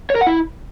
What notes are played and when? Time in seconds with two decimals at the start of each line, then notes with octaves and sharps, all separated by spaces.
0.10 C#5
0.16 A#4
0.21 F#5
0.27 E4